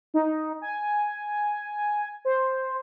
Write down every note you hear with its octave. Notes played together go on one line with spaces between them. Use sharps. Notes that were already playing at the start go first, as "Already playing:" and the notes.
D#4
G#5
C5